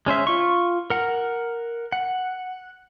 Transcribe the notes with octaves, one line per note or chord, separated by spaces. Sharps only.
G#3 C#4 C5 E5
F4 C#6
A#4 F#5
F#5